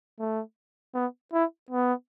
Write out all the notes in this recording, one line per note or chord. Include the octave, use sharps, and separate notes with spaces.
A3
B3
E4
B3